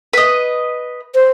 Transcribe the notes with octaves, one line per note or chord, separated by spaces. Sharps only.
B4 D#5
C5